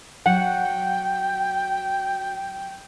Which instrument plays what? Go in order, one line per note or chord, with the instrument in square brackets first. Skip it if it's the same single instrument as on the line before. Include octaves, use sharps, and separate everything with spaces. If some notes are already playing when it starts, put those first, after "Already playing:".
[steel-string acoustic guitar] F#3 [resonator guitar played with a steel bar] F#5 [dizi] G5